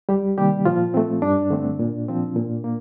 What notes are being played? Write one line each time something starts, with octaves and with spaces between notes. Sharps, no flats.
C2 G3 G4
C3 D#3 G3 A#3 G4
A#2 F3 F4
A3 C4
G2 D4
D3 A3 C4
A#2
F3 C4
A#2
A#3